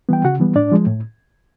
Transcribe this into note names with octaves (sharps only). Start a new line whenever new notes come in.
E3 G3 B3 G5
C#3 F#4 F#5
E3 G3 B3
A2 D4 D5
F3 G#3
A2